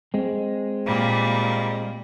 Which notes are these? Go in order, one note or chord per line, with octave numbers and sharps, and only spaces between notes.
G#3 C4
A#2 G3